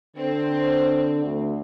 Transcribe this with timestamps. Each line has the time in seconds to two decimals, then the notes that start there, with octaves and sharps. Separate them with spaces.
0.16 D3 C4
1.24 D2